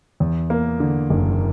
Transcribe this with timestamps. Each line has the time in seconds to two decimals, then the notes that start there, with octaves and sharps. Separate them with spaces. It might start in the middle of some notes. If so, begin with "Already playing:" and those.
0.20 E2
0.50 A#3
0.80 D3
1.10 F#1